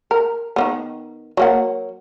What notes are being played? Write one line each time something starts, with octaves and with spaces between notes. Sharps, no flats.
A#4
D#3 A#3 B3
F#3 A#3 F#5